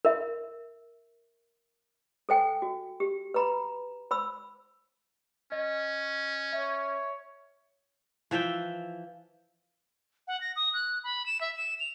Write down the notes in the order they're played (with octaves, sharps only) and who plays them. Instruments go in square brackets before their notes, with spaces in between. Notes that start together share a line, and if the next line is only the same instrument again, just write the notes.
[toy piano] A#4 E5
A4 C5 G5 G#5
F#4
G4
B4 A#5 B5
C5 B5 E6
[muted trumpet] C#4 [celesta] D#5
[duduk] C#5 [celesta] E5
[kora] E3 F3 E5 G5
[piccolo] F#5
A#6
D#6
F#6
B5
E7
E5
E7
F7